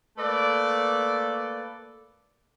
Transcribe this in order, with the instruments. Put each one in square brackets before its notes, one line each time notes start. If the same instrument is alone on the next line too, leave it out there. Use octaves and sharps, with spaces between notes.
[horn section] A3 A#3 A4 B4 D5